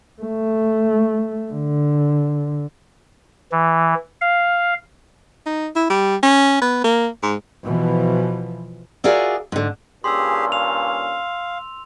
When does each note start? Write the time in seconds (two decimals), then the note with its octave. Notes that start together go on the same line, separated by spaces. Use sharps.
0.21 A3
1.52 D3
3.52 E3
4.21 F5
5.46 D#4
5.76 E4
5.90 G3
6.23 C#4
6.61 B3
6.84 A#3
7.23 G#2
7.64 B2 E3 F3
9.04 F4 F#4 G#4 A#4 D5 E5
9.52 G#2 D3
10.04 G2 A#2 C#4 G4 G#4 C6 E6
10.52 F5 F7